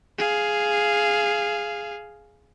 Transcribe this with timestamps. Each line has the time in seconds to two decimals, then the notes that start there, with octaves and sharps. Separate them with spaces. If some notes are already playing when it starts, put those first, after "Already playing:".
0.18 G#4 F5